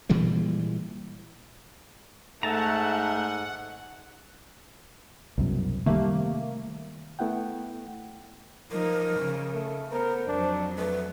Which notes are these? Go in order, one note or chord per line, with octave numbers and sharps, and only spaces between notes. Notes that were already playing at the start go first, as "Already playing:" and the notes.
A#2 E3 G3 G#3
G#2 A3 E5 F#5 A5 A#5
C2 F#2 B2
C3 D#3 G3 A3 A#3
A3 B3 E4 F#5 G5
F3 D#4 A#4
C#3
A3
B3 A#4 C5
F2 F#3 D4
A3 B4